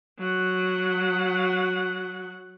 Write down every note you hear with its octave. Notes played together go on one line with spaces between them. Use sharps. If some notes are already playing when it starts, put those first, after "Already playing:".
F#3 F#5